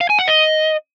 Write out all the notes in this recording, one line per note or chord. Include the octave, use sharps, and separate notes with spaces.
F5
G#5
F#5
D#5